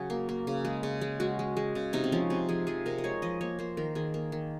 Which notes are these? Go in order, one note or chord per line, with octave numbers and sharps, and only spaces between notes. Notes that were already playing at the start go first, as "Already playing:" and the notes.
Already playing: C#3 F#3 G#4
A#3
A#3
C#3
G#3
C#3
G#3
G#3 F#4
G#3
G#3
C#3
C3 D#4
C4
F3 C#4
C3 C4
F3 G#4
F3 G#4
C3 A#4
D#5
G#3 C#5
F3 D#5
A#3 C#5
A#3 C5
D#3 A#4
D#3 G#4
A#3
D#3